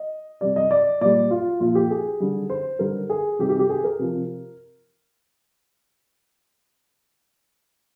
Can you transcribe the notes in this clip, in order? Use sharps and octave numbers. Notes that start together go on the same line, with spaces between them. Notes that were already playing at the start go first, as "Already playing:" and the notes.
Already playing: D#5
C3 G3 D5
D#5
D5
A#2 G3 D5
F4
A#2 F3 F4
G4
G#4
D3 G3
C5
D3 G3 A#4
G#4
C3 D#3 G3 G4
G4
G4
G#4
A#4
C3 F3